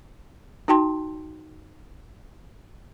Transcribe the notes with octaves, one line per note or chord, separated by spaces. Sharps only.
D#4 F#4 G5 A5 C6